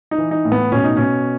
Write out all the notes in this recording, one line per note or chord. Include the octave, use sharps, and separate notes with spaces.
D#4
E3
D#4
A2
B3
B2 C#4
D#4
B2 C#4